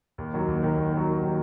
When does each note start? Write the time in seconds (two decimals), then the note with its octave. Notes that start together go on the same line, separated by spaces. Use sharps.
0.18 D#2
0.33 D#3 F#3
0.48 D#2
0.62 D#3 F#3
0.77 D#2
0.92 D#3 F#3
1.07 D#2
1.22 D#3 F#3